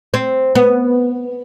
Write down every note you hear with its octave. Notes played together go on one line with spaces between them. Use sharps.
C4
B3